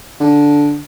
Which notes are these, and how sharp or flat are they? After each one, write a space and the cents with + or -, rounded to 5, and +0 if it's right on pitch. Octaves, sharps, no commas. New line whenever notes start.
D3 -10